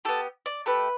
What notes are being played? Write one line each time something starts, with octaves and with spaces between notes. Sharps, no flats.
B3 G4 A4
D5
A3 G4 B4